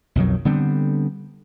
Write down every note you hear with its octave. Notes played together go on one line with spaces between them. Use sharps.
B1 F2 D#3 F#3
D3 G3 B3 C4